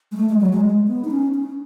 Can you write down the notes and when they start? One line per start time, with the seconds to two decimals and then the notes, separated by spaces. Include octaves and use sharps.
0.12 G#3
0.17 A3
0.29 G#3
0.40 F#3
0.53 G#3
0.64 G#3
0.88 B3
1.04 D#4
1.11 C#4
1.35 C#4